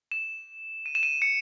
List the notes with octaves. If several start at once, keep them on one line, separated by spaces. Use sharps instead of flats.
E7
D#7
E7
D#7
C#7